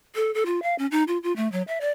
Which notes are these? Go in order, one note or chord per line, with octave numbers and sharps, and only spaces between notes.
A4
A4
F4
F5
C#4
D#4
F4
F4
A3
F#3
E5
D5